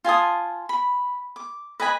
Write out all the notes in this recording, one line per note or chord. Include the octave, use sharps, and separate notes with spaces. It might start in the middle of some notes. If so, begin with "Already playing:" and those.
F4 G#5 A5 D#6
B5
D6
B4 D#5 G#5 B5